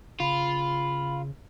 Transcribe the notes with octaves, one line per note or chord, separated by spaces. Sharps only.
C#3 F4 B5